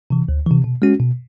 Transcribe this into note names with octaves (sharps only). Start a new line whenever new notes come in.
C3 E3
D2
C3 E3
B2
G#3 C#4 F#4
B2